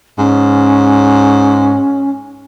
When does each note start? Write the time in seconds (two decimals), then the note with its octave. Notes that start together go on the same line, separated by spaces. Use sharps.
0.19 G#2 C#4